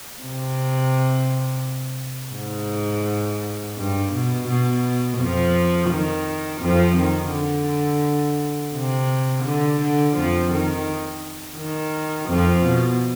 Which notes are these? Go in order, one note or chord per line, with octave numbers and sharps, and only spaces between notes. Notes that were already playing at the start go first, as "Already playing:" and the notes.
C3
G#2
G2
B2
B2
F2 F3
D#3
F2 F3
D#3
D3
C3
D3
D3
F2 F3
D#3
D#3
F2 F3
B2